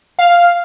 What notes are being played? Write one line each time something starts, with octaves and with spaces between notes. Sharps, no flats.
F5